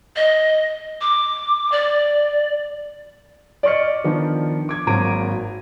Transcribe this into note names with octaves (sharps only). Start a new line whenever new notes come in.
D#5
D6
D5
D5 D#5 C#6 F6 C#7
D#3 F3 B3 D4
D6 G#6
G#1 F#3 A#3 A#5 D7 D#7